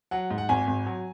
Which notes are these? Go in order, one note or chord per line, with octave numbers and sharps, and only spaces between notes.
F#3 F#5
G#2
F#5
G#1 G#5
G#1
F#3